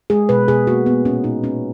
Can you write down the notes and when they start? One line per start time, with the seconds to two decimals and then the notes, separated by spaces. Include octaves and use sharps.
0.10 G#3 G#4
0.29 B2 B4
0.48 B2 G#4
0.67 A#3 F#4
0.86 A#3 B3
1.05 A#2 C#4
1.24 A#2 D#4
1.44 A#3 C#4